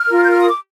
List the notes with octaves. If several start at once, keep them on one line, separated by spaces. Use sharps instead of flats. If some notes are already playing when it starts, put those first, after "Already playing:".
Already playing: F6
F4 A#4
G6
F6
D#6
D6